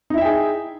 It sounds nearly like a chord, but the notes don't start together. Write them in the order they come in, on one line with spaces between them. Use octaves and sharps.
D#4 E4 E5 G5 G#4